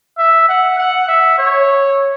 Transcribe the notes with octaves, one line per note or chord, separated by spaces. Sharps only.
E5
F#5
F#5
E5
C#5